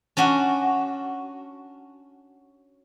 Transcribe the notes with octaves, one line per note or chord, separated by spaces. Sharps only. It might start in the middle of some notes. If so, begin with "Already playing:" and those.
C#4 D4 F#4